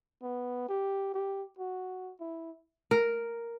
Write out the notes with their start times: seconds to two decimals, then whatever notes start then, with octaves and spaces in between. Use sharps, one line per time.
0.23 B3
0.69 G4
1.14 G4
1.59 F#4
2.20 E4
2.91 A#4